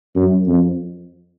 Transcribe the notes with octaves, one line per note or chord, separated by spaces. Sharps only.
F#2
F2